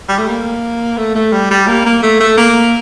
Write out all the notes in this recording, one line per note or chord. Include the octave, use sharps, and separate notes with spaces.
G3
A3
A#3
A3
A3
G3
G3
A#3
A#3
A3
A3
A#3